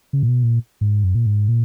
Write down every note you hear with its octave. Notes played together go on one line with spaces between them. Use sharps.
C#3
A#2
B2
A#2
G#2
F#2
A#2
G#2
A#2